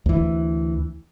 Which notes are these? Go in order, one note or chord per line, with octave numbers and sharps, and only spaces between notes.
D2 E3